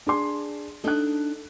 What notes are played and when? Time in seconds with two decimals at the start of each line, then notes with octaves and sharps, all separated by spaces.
0.07 D4 G#4 C6
0.84 D4 D#4 A4 D#5 F#6